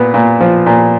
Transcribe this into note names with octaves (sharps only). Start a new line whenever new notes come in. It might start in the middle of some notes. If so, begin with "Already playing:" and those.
Already playing: A#2 B3
A#2
F3
A#2